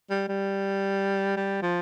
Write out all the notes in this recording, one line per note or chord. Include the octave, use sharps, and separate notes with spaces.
G3
G3
G3
F3